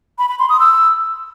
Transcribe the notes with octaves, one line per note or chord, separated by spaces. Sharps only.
B5
B5
C6
D#6
E6